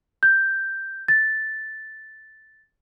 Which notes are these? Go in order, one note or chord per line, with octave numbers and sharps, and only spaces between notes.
G6
A6